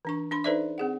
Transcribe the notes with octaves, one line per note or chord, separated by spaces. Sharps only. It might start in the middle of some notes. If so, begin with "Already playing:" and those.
E3 D4 C#6
D4 B5 C6
D#4 A4 B4 C5 D5 E5
C4 G#4 F#5